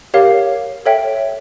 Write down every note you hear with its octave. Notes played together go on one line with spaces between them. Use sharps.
G4 A#4 C#5 F5
A4 C#5 E5 G5